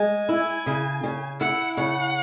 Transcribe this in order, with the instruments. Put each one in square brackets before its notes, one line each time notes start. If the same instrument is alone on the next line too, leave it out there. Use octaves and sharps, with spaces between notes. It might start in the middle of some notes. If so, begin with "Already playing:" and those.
Already playing: [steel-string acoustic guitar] G#3 [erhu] G#5
[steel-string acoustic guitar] E4
C#3
C#3
[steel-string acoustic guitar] E4 [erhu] F#5
[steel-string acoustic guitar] C#3 [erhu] F#5